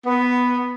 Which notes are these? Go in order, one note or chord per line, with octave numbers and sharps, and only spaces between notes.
B3